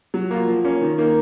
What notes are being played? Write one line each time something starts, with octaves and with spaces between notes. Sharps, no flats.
F#3
A#3 F4
F3
A#3 C#4
D#3
A#3 D#4 A#4